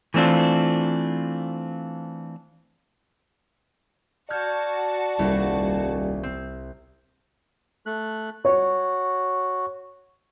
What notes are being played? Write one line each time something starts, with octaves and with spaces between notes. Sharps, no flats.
E3 A3 C4 D4 F4
F#4 D5 A5 F6 G6 G#6
D#1 C2
C4
A3 F#6
F#4 C#5